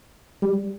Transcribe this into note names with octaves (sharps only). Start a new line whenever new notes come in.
G3